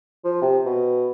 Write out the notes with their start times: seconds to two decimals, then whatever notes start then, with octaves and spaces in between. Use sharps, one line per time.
0.24 F3
0.42 C3
0.65 B2